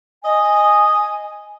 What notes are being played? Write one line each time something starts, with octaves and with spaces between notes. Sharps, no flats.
D#5 G#5